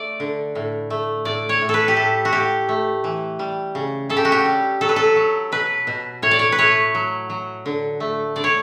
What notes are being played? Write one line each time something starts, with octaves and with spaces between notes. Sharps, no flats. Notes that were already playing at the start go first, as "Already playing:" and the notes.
Already playing: A3 D5
D3
A2
A3
A2 D5
C#5
A2
A4 B4
G4
A2 A4
F#4
A2 G4
A3
E3
G3
C#3
C#3 A4
G4
F#4
G4
G3
F#3 A4
B4
A4
F#3
B2 B4
B2
A2 C#5
D5
C#5
B4
A3 C#5
F#3
F#3
D3
A3
D3 D5
C#5